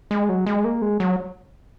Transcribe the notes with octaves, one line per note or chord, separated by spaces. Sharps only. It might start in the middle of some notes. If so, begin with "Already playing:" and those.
G#3
F#3
G#3
A#3
G#3
F#3